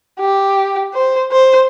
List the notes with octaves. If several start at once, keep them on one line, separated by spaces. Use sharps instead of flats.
G4
C5
C5